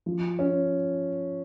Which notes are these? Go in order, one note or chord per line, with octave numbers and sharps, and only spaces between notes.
F3
C#4